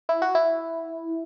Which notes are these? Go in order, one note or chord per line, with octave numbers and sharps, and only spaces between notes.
E4
F#4
E4